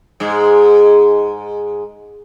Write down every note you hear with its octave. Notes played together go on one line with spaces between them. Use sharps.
G#2 G#3